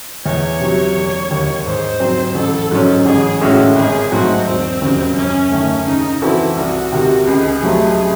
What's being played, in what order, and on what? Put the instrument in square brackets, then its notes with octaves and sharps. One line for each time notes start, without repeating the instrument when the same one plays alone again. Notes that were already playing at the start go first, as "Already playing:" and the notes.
[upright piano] E2 [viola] C#5
[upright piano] C3 F#3
E1
D#2 D#3
[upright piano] G#2 [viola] C5
[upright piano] F#3 C4
[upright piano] A1 [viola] A4
[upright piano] G#2 F#3 C#4
[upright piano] A1 [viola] G#4
[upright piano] A2 G#3 C#4 F#4 [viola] A4
[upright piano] G#1 [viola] G#4
[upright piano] G#2 F#3 A3 C4 [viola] F#4
[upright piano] E1 [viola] C4
[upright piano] D#2 C#3 F#3
[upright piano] F#2 [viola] C#4
[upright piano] D#3 A3
[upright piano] C#3 [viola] D#4
[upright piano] E3 C4 F#4 A4 [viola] E4
[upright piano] C2 [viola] F#4
[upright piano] C3 D#3
[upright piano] C#2 [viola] G#4
[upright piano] C3 F#3 A3 C4